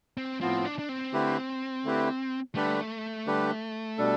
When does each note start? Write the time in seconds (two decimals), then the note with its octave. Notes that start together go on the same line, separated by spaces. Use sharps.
0.17 C4
0.41 A2 F3 B3 C4 F4
0.65 D4
0.79 D4
0.89 C4
1.13 D3 A3 E4 G4 B4
1.84 D3 A3 E4 G4 B4
2.55 D3 G3 A3 D4 G4 B4
3.26 D3 G3 D4 G4 B4
3.98 B2 G3 D4 A4